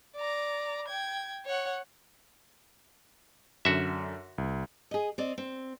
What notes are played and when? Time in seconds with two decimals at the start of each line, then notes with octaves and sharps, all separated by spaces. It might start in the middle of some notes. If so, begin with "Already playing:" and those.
0.16 D5 A#5
0.87 G5 G#6
1.45 C#5 F#5
3.65 F#2 D3 F#4 E5
4.38 C2
4.91 G#4 D#5
5.18 C4 D5 D#5
5.38 C4